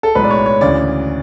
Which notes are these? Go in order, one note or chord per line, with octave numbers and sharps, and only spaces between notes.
A4
B1 A2 G#3 B4
D5
C#5
C#5
D2 C#3 E3 D5